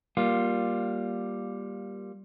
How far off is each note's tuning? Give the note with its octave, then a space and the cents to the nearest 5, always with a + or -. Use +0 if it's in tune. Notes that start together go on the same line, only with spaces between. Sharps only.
G3 +0 A#3 +15 F4 +10